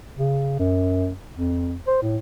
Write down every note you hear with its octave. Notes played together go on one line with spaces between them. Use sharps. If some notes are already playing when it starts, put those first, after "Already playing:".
C#3
F#2
F2
C5
A2